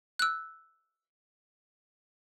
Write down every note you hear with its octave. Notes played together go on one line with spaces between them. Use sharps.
E6 F#6